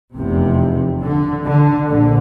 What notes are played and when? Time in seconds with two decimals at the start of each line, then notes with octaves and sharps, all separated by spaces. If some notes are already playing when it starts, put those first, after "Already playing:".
0.14 F1 E2 C3
1.02 D3
1.46 D3
1.90 A#1 D3